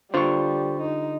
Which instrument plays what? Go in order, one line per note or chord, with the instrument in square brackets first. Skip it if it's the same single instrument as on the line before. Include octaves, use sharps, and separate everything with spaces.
[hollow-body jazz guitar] D3 D4 F4 [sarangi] G3 [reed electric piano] C5 C#6
[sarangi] D#4